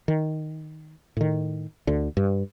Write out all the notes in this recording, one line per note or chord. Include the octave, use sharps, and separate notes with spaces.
D#3
A2 D#3
D2 D3
G2